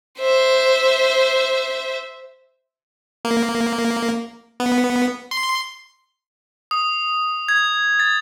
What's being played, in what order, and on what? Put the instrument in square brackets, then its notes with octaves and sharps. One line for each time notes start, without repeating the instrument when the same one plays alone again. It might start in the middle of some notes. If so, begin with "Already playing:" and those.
[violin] C5 E5
[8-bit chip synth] A#3
B3
C6
[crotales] D#6
G#6
A6